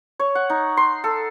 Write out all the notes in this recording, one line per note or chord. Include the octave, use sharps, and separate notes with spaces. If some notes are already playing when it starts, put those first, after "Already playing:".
C#5
F#5
D#4
C6
A4